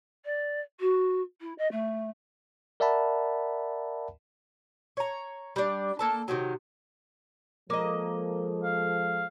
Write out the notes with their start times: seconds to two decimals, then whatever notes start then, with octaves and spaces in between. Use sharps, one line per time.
0.25 D5
0.80 F#4
1.41 E4
1.58 D#5
1.71 A3
2.80 A#4 D5 E5 F#5 A5 B5
4.97 C#5 A#5
5.56 G3 D4
5.99 A#3 A4 A5
6.28 C3 D#3 F#3
7.70 F3 G#3 A#3 A4 D#5
8.64 F5